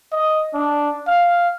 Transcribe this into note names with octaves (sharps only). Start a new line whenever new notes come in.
D#5
D4
F5